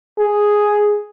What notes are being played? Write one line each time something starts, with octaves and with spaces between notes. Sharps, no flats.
G#4